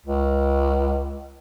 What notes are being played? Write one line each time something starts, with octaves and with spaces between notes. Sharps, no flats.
C#2